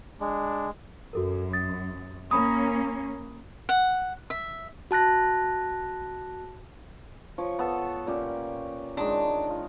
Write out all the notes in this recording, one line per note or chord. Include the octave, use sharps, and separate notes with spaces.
G#3 D4
F#2 F#4 A4 A#4
D#6 A6
A#3 C#4 C#5 B5 D#6
F#5
E5
F#4 A5 F#6 A#6
F3 C#5
B3 A4
A#2 C#4 G4
D#3 G#3 D4 D#4
F4